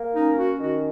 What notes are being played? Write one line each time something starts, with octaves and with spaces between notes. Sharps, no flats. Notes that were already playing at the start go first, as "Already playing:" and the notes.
Already playing: A#3
C#4 D#4
F#4
D#3 F#4